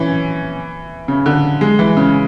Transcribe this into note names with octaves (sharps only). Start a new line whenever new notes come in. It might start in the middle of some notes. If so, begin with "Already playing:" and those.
Already playing: E3 C#4
C#3
D3
G#3
E3
C#3